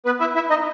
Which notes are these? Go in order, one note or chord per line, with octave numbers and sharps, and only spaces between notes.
B3 B4
E4 E5
E4 E5
D#4 D#5